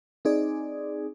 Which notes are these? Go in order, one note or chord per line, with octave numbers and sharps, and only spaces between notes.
C4 D#4 G#4 D5